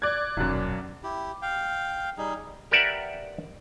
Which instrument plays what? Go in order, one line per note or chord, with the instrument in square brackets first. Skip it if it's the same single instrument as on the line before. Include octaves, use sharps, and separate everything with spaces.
[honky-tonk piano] D5 G#6 [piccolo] F#6
[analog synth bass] D#1 [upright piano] B1 F#2
[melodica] E4 G4
F5 G5
G3 D#4 G#4
[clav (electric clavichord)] G4 A#4 B4 D5 E5 F#5